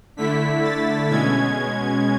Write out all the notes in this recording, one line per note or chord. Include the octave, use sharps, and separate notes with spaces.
D3 A3 E4 B6
A6
B2 G#3 C#4 G#6